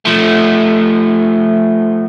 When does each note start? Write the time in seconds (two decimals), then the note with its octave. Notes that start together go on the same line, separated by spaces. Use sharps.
0.05 F3 A3